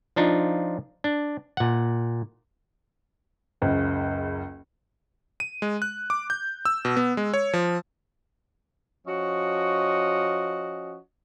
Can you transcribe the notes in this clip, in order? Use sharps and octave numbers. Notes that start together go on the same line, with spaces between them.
F3 D4 D#4 F4
D4
A#2 F#5
F#1 C#2
D#7
G#3
F#6
D6
G6
E6
B2
B3
G#3
C#5
F3
F3 C#4 F#4 D#5